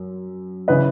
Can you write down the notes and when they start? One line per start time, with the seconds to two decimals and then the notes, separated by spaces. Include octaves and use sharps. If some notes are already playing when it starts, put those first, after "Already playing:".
Already playing: F#2
0.68 C#3 E3 B4 D#5